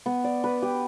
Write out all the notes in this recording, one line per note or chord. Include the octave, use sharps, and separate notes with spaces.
B3
D5
B4
G4